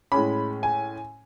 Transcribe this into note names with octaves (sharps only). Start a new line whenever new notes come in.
A2 G#3 C#4 B5
G#5